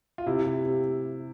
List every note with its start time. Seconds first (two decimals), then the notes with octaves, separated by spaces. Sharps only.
0.18 F4
0.26 C3 E4
0.46 C3
0.65 C3